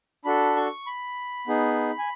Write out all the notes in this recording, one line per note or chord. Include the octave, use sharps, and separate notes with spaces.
D4 F#4 A4 B5
C#6
B5
B3 D#4 G#4
G#5